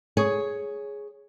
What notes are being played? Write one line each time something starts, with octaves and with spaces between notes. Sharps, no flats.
G#4 C#5